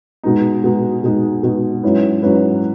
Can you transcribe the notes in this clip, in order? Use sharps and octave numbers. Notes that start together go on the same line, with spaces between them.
B2 G#3 D#4
B2 G#3 D#4
B2 G#3 D#4
B2 G#3 D#4
G#2 F#3 C#4 E4 B4
G#2 F#3 C#4 E4 B4